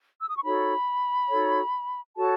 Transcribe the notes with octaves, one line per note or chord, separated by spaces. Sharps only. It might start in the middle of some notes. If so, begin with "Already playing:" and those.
E6
D#6
C#6
D#4 F#4 A4 C#5 B5
D#4 F#4 A4 C#5
F#4 A4 C#5 A5